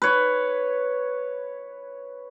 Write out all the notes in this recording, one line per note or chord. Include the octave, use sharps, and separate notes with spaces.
B4 C#5